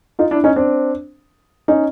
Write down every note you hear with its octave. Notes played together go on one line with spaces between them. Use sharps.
D#4 F4
D4 E4
C#4 D#4
C4 D4
C#4 D#4